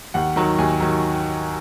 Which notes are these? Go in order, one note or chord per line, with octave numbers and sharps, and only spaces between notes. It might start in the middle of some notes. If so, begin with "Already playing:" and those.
D#2 F#5
D#3 F#3
D#2 G#5
D#3 F#3